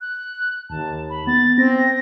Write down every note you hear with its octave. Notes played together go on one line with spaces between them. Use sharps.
F#6
D#2 A5
B5
B3 A6
C4 A#6